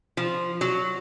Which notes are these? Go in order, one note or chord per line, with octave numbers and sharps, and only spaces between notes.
F3
F#3